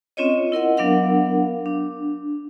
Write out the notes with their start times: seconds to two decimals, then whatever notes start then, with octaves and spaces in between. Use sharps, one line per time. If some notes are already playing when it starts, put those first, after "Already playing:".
0.17 C4 C#4 F4 C#5 D#5
0.52 E4 A#4 D#5 F#5
0.77 F#3 B3 D4 A#4 F5 F#5
1.66 D4